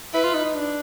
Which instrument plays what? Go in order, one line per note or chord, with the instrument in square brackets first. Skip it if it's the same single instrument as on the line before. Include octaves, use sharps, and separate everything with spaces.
[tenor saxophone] E4 [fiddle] B4
[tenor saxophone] F4
D#4
D#4
D4